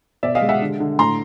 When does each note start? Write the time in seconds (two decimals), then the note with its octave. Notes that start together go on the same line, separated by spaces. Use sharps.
0.23 B2 D5 E5
0.35 D#5 F5
0.42 G#3
0.49 E5 F#5
0.62 D3
0.80 D3
0.99 A2 A#5 C6